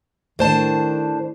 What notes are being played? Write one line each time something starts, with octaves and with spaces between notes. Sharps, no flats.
A2 D#3 D4 C5 A5